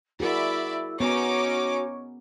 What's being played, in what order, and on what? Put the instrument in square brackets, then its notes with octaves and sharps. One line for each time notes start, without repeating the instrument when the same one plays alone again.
[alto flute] E4 [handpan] F#4 G#4 A#4 [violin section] D5 E5 B5
[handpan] B3 [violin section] C#4 D#4 D6 [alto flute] F#4 [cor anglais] C#5